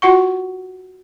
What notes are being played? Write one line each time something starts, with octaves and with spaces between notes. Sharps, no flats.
F4 F#4 F#5 C#6